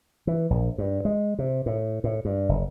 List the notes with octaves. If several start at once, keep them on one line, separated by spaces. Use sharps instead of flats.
E3
A#1
G2
G#3
C3
A2
A2
G2
F#1